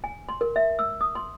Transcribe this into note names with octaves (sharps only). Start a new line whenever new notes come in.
G#5
C6
A#4
E5
E6
D#6
C6